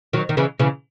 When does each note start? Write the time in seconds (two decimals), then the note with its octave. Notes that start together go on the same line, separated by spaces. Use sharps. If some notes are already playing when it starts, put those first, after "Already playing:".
0.13 D#3 F#3
0.29 D#3
0.37 C#3 E3
0.59 C#3 E3